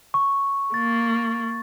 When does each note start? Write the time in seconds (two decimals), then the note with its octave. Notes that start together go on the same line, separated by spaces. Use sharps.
0.14 C#6
0.74 A#3 A6